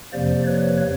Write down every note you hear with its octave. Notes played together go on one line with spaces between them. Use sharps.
F2 C3 F3 A#3 C5 D5
B4 C#5